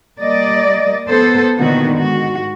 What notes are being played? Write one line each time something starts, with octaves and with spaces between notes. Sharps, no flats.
G3 A#3 D5 D#5
B3 A4 C5
A#2 D3 D#3 B3 F#4
G#2 F#4